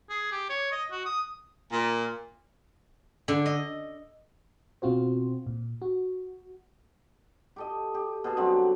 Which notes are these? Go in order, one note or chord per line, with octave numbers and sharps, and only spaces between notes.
G#4
G4
C#5
D#5
F#4
D#6
A#2
D3
D#5
B2 C4 F4 F#4 C5
A#2
F#4
G4 A4 D#5
G4
B2 G#4 A5
D3 F#3 G3 C4